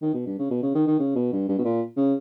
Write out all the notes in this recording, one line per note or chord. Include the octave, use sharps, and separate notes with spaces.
D#3
B2
G2
C#3
B2
C#3
D#3
D#3
C#3
B2
G2
G2
B2
A#2
C#3